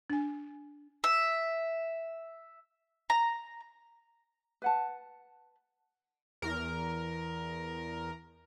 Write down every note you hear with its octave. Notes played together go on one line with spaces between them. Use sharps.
D4 G#5
E5
A#5
B4 F#5 A5
E2 A#4